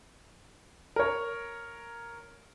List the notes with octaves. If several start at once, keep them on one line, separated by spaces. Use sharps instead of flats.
A#4 C#5